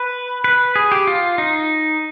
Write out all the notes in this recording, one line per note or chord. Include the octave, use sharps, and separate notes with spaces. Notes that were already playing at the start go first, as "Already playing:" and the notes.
Already playing: B4
B4
G#4
G4
F4
D#4